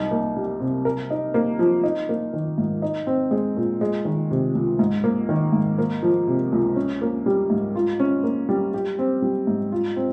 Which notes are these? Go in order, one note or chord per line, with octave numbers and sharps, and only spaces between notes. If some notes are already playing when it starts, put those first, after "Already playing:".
Already playing: C2 D#4
A#3
G3
C3
A#4
D#4
A#3
F3
D#4
A#3
D#3
G#2
D#4
C4
G#3
A#2
G#3
D#3
C3
C#2
G#2
A#3
D#3
G#2
A#3
F3
C3
C#2
C#4
A#3
G3
G#2
F4
C#4
A#3
G3
G4
C4
G3
G#2
F4
C4